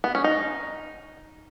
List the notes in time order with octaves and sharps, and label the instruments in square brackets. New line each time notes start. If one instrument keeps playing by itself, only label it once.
[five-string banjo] B3
C#4
D#4